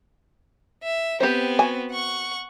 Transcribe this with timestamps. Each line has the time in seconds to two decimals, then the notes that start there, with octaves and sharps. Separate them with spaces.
0.83 E5
1.20 B3 C4 G4 C5
1.59 F#4 G#5
1.91 F#5 C#6